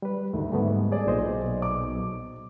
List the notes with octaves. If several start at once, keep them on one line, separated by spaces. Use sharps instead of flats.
G3 B4
D2 D#3 A3
G#2 G3 A3 B3
G#4 D5
B1 A#2 C5 D#5
D6